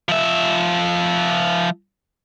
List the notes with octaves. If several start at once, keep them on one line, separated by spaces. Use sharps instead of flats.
F3 E5